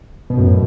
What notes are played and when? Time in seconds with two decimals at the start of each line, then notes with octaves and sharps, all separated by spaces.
0.30 B2
0.37 F#2 A2